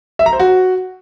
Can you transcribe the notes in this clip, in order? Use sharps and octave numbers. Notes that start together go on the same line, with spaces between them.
E5
A#5
C5
F#4